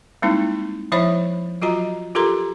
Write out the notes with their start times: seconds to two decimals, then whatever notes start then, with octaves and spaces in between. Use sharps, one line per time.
0.22 G3 G#3 A#3 C4 D#4 E4
0.92 F3 E4 C5 C#5 E5 B5
1.62 F#3 F4 F#4 D#5 A#5
2.15 F4 G4 A4 A#4 A#5 C6